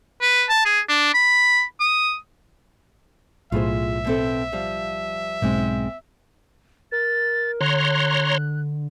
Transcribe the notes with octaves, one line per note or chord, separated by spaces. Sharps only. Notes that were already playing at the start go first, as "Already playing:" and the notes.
B4
A5
G#4
D4
B5
D#6
B1 A2 F4 G#4 C5 E5
B2 C4 A4
F3 G3 F5
B1 G#2 G#3 C4
A#4 A6
D3 C#5 A#5 C6 F#6